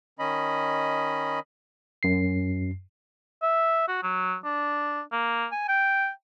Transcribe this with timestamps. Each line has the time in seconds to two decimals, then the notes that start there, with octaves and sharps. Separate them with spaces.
0.19 D#3 C#4 D#5 B5
2.03 F#2 C7
3.42 E5
3.88 F#4
4.03 F#3
4.45 D4
5.12 A#3
5.52 G#5
5.68 G5